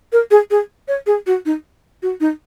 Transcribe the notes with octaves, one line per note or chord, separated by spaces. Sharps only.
A#4
G#4
G#4
C#5
G#4
F#4
D#4
F#4
D#4